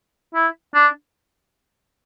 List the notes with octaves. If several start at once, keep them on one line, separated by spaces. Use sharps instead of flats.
E4
D4